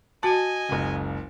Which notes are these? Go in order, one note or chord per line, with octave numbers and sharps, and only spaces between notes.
F#4 D#5 G#5 A5 A6
F#1 C#2